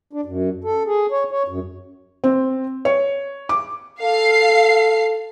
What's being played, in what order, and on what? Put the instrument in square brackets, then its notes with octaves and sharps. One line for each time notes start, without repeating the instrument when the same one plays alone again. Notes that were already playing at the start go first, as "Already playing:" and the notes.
[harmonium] D4
F#2
A4
G#4
C#5
C#5
F#2
[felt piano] C4
C#5
D6
[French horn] A4 [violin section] F5 C7